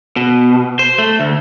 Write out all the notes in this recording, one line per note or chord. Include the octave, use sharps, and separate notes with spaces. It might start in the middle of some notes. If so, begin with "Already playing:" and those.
B2
C5
A3
D2